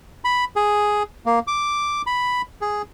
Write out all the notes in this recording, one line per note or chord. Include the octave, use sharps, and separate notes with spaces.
B5
G#4
A#3
D6
B5
G#4